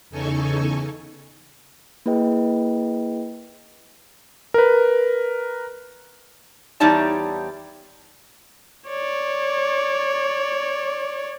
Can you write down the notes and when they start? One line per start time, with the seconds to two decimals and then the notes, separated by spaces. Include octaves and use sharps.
0.10 E2 C#3 D#4 A4 G#5 C#6
2.06 A#3 E4 G#4 B4 D#5 G5
4.54 A#4 B4
6.80 E2 G3 D#4 C#5 D5 A5
8.89 C#5 D5